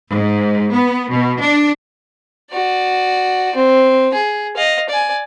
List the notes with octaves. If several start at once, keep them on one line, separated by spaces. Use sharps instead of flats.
G#2
B3
B2
D4
F#4 D5
C4
G#4
D#5 F5
D5 G#5